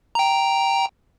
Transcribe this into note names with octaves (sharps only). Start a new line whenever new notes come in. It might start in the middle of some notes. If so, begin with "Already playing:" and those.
G5 A#5